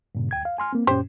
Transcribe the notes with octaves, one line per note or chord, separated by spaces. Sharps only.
G2 A#2 C#3
D2 G5 G#6
F5
G#5 C6 F6
A#3 C4
F#2 A#2 C#4 G4 C5